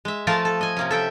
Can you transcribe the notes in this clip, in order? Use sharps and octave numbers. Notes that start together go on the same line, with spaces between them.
G#3 E5
F3 A3 F4 A#4 F5 A5
A4
D#5 G#5
C3 A#3 C#4
A4 E5 G5